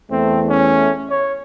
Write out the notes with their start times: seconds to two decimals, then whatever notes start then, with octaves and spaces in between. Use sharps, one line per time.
0.11 E2 A3 C4
0.49 C#4
1.10 C#5